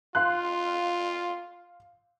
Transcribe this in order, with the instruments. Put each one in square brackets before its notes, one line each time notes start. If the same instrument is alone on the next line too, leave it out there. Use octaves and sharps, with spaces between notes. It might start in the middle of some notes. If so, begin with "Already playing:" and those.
[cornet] F4 [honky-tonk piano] F5 C6 F#6